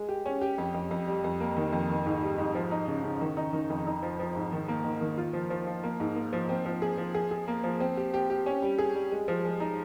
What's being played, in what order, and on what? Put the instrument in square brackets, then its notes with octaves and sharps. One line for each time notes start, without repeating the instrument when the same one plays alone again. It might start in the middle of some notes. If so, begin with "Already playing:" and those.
Already playing: [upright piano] G#3
G4
C#4
G4
F2
F2
F2
G3
F2
A#3
D#3
F2
D#3
G#2
G3
G#2
F3
D#4
C#3
C#3
D#3
D#4
D#3
F2
D#4
F3
F3
G#2
D#3
A#3
D#3
D#3
F4
F3
F3
F3
A#3
G#2
A#3
F3
C4
F3
G#4
F3
G#4
G#4
A#3
F3
C4
G4
G4
G4
C#4
G3
G#4
G3
G#3
F3
G#3
D#4